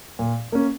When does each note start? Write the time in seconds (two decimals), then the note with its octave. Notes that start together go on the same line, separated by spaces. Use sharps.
0.19 A#2
0.52 A#3 C#4